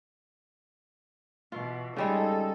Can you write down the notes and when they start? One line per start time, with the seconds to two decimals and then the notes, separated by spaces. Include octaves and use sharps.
1.52 B2 E3 F4
1.97 C#3 G3 G#3 D#4 A4